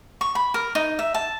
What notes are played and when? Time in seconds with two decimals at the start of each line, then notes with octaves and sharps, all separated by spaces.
0.21 C#6
0.35 B5
0.54 A#4
0.75 D#4
0.99 E5
1.14 A5